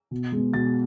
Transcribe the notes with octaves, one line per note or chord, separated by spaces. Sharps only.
B2
G#3 B3
B2 A6